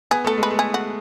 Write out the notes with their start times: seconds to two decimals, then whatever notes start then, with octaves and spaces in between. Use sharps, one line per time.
0.11 B3 G#4
0.25 A3 A4
0.38 G#3
0.43 B4
0.51 A3
0.59 G#4
0.74 F#4